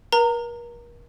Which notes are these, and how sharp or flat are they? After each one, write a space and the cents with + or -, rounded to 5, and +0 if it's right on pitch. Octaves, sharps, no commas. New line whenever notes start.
A#4 +40 A#5 -20